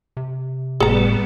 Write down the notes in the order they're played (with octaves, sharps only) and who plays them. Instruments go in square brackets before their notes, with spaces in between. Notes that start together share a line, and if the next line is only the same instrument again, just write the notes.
[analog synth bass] C3
[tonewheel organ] G1 A2 A3 [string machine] G3 B3 [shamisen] G#4 A#5